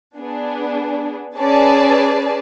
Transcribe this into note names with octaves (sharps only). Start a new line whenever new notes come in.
B3 D4 G#4
C#4 G#4 B4 D5 A5